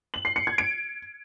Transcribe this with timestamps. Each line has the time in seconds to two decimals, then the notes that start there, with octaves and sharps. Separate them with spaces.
0.14 F#7
0.25 C7
0.36 C#7
0.47 G#6
0.58 D7